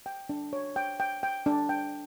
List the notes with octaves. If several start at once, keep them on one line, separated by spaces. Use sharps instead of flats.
G5
D4
C#5
G5
G5
G5
D4
G5